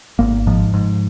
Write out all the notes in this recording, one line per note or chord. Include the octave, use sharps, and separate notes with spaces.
G#1 A#3
G#2 F3
G#2